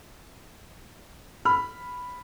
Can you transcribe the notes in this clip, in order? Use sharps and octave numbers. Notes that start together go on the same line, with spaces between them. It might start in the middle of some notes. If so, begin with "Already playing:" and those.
B5 F6